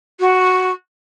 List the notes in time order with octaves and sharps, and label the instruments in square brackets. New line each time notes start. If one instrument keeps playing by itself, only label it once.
[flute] F#4